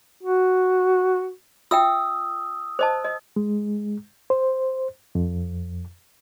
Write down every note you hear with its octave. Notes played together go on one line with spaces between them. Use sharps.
F#4
F4 E5 G5 D#6 E6
C5 D#5 A5
D#5
G#3
C5
F2